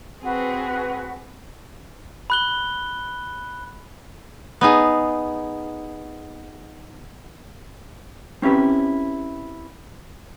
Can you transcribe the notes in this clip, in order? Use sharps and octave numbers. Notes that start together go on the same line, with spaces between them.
C4 F#4 G#4 B4
B5 F#6 G7
B3 D#4 G#4
C4 C#4 E4 G4 B4